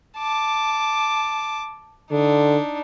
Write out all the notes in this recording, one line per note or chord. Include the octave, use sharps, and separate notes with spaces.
A5 D6
D3 D4 D#4